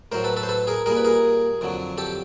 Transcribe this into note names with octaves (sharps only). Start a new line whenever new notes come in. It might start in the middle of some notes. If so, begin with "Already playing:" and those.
A2 F#3 A#4 C5
A4 B4
A4 B4
C5
A4 B4
G#4 A#4
A#2 G3 G#4 A#4
B4
G#4 A#4
F2 D3 F#3
G4 A4